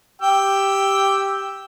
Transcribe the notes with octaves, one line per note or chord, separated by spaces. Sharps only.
G4 G5 E6